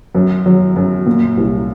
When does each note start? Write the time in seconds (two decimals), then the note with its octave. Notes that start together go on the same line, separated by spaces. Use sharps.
0.15 F#2
0.46 F#3
0.76 F#2
1.06 A#2
1.37 C2